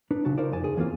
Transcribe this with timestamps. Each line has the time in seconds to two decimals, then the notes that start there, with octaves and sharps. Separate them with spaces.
0.11 D4 D#4 B4
0.25 B1 C#3 F#4 A5
0.38 D#4 F4 A#4 C5 D5
0.52 F2 G#5 A5
0.64 G#4
0.77 E2 E3 A#3 C4 F4 F5